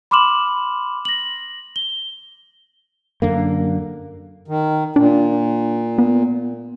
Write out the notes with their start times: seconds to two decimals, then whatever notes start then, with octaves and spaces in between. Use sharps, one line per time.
0.11 B5 C6 D6 F6 E7 F#7
1.05 A#6 F#7
1.76 G7
3.22 F#2 D3 A#3
4.48 D#3
4.96 A#2 D4
5.98 B3